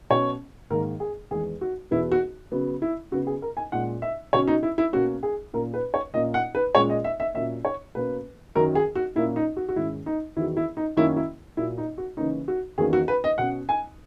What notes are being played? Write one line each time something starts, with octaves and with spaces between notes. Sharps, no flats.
B2 F#3 C#4 C#5
G#2 D#3 A#3 A#4
G#4
E2 D#3 G#3 B3 G#4
F#4
E2 B2 F#3 B3 E4
F#4
C#3 F#3 B3
E4
C#3 F#3 B3 F#4
G#4
A#4
G#5
A#2 G#3 C#4 F#5
E5
B2 F#3 C#4 C#5
D#4
E4
E4
B2 A#3 C#4 F#4
G#4
A#2 A#3 C#4 A#4
B4
C#5
A#2 A#3 C#4 D#5
F#5
B4
A#2 G#3 C#4 C#5
D#5
E5
E5
A#2 F#3 A#3 C#4 E5
C#5
B2 A#3 C#4 B4
F#2 D#3 F#3 C#4 A#4
G#4
F#4
A#2 A#3 C#4 E4
D#4
F#4
F#4
G#2 D#3 G#3 C#4 E4
D#4
E2 D#3 F#3 E4
E4
D#4
F#2 D#3 A#3 C#4 E4
E4
A#2 F#3 A#3 E4
D#4
F#4
C#3 E3 A#3 C#4 D#4
F#4
E2 D#3 F#3 A#3 C#4 G#4
F#4
B4
D#5
B2 F#3 C#4 F#5
G#5